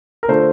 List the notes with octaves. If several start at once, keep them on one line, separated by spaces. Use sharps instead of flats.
A#4
D3 A3 D4 F4 C5